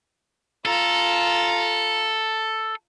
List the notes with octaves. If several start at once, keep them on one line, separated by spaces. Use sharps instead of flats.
F4 A4 A#5